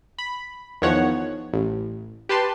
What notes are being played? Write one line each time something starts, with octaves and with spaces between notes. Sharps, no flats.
B5
E2 D#3 F3 C#5 F#5
A1
G4 B4 A5 C6